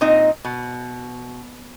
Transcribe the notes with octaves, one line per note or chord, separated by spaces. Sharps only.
A#2 C4 D#4 D#5
B2